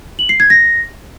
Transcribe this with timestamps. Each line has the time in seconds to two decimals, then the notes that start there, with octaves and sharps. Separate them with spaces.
0.19 F#7
0.29 C7
0.40 G#6
0.50 A#6